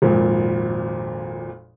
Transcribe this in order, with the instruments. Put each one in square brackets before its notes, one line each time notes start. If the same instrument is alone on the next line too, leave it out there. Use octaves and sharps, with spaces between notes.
[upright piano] G#1 F2 A#2